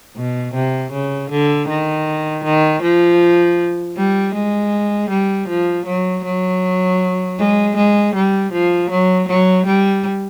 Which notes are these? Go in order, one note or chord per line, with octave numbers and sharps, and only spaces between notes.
B2
C3
C#3
D3
D#3
D#3
F3
G3
G#3
G3
F3
F#3
F#3
G#3
G#3
G3
F3
F#3
F#3
G3